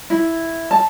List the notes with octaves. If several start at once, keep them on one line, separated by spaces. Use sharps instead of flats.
E4
A5